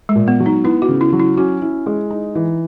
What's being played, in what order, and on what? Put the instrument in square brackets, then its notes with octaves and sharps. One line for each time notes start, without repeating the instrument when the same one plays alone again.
[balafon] G#3
[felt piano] A#2
[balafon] B3
[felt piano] F#3
[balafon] D#4
[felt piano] B3 [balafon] E4
[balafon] F#4
[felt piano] C#3
[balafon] E4
[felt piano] F#3
[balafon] E4
[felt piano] C#4 [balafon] F#4
[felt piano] E4
G#3
D#4
E3